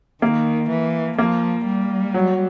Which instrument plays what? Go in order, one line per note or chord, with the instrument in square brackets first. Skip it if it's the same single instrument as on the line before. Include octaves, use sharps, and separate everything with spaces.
[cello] D#3 [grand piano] A#3
[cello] E3
[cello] F3 [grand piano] A#3
[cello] G3
[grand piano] F#3